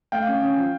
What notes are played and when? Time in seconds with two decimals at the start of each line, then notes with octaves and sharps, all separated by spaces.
0.12 A3 F5 G5
0.27 C#4
0.42 C#4
0.57 F3